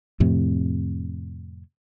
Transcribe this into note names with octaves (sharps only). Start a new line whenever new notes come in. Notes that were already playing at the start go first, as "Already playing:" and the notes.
F2 A2 C3